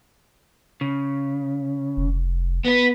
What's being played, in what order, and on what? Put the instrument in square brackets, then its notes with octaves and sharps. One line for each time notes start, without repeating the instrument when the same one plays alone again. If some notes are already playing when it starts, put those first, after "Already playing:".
[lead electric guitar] C#3
[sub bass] F1
[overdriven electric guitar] B3 B4